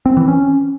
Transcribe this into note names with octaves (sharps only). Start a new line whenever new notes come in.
C4
E3
C#4